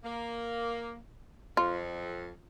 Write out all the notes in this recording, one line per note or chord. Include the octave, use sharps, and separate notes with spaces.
A#3
F2 F4